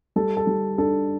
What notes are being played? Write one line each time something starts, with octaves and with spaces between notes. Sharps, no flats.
G3 A4
A4
G3
D4 A4